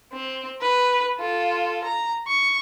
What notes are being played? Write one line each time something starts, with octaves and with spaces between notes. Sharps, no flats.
C4
B4
F4 A4
A#5
C#6